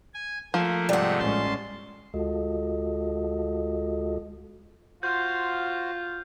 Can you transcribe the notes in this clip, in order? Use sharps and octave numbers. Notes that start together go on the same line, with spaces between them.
G#5
F3 A3 A#3
G#2 C3 G3 A3 F#5
A1 G#3 C#4 A5 C6
D2 G#3 F4 F#4 A4 D#5
F4 F#4 C5 G6